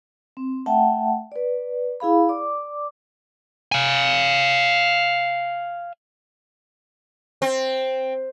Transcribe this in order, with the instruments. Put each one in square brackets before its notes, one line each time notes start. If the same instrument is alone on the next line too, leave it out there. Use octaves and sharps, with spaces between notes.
[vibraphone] C4
A3 E5 F#5 G5 A5
B4 D5
E4 G#4 F5 B5
D5 D6
[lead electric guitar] F5 G#5
[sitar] C4